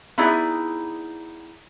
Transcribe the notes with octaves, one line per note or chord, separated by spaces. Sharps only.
B3 D#4 E4 G#4 D5